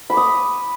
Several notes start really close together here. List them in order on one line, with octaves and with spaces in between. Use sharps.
B5 D6 D#6